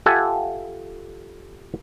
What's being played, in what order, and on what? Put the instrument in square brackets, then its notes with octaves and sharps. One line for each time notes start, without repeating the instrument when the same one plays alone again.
[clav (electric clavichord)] F4 G4 A4 E5 F#5 G#5